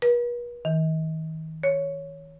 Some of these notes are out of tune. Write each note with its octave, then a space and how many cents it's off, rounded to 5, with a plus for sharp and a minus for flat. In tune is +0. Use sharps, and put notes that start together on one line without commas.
B4 -45
D#3 +40
C#5 +5